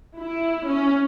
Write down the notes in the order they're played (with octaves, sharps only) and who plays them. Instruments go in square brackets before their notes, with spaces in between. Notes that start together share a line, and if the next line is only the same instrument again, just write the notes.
[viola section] E4
C#4